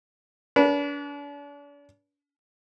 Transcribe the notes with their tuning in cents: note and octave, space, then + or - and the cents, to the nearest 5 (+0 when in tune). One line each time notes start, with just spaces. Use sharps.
D4 -40 B4 -30